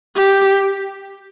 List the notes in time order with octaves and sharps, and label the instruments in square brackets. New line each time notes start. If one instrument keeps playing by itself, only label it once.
[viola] G4